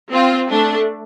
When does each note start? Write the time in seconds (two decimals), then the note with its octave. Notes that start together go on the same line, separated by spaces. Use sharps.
0.12 C4 F4
0.50 A3 D4